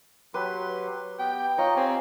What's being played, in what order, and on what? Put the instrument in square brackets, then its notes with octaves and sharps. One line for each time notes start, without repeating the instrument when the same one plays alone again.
[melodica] F#3 G4 C6 [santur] B4
[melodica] B3 G4 [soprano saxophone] G5
[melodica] D#4 D#5 [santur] F4 C#5
[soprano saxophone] C4 [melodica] G4 G#5